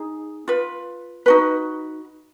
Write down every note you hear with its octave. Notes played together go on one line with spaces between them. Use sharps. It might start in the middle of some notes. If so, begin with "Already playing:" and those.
Already playing: D#4 G#4
F4 B4
D#4 F#4 B4